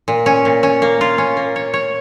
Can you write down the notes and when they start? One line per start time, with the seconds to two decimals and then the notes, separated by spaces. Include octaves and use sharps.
0.08 A#2
0.26 C#4
0.45 A#2
0.63 C#4
0.82 A#3
1.01 F4
1.18 C#4
1.37 A#3
1.56 C#5
1.74 C#5